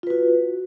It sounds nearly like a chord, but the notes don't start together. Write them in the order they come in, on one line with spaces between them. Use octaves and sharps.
F4 B4 F#4